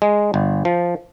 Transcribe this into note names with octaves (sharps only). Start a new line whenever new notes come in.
G#3
G1
F3